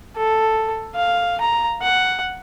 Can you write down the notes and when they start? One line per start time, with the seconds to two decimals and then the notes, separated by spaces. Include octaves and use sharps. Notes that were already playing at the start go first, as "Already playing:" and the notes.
0.16 A4
0.95 F5
1.41 A#5
1.82 F#5